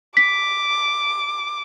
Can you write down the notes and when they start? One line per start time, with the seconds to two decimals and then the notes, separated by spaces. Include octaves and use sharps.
0.17 D6 B6